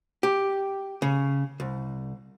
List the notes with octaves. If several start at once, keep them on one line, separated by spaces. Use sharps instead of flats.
G4
C#3
C2